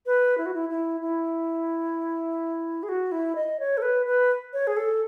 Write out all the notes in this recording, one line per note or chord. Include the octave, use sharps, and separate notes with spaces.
B4
E4
F#4
E4
E4
E4
G#4
F#4
E4
D#5
C#5
A4
B4
B4
C#5
G#4
A4